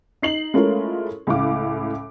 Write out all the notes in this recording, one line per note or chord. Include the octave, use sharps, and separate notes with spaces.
D#4 C7 F#7
G#3 A3 C#4 E4 F4 A#4
C#2 A2 F5 D6